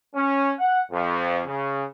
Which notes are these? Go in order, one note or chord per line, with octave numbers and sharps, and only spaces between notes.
C#4
F#5
F2
C#3